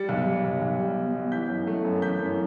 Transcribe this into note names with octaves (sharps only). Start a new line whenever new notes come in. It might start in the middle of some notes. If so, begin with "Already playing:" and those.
Already playing: G3 A6 C#7
B1
G3
B1
B1
G3
B2
B2
E3 G6 B6
F#2
A3
F#2
E3 G6 B6
F#2